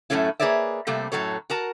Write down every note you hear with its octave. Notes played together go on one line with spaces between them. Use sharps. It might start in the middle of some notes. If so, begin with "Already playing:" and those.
F#2 A2 D3 A3 C#4 E4
A#3 G#4 B4 C#5 D5 E5
C3 G3 A3 A#3 C4
F#2 A2 F#3 A4 C#5
F#4 A#4 A5